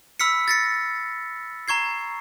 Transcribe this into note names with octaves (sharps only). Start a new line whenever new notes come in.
B5 E6 F6 B6 C#7
A6 A#6 C#7
A#5 C#6 G#6 C7